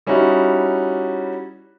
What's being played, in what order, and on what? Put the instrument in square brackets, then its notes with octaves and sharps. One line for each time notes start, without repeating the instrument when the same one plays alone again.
[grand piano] G3 C#4 D#4 E4 F#4